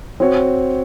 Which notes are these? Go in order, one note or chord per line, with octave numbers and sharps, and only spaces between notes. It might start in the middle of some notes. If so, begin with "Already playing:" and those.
C4 F#4 C#5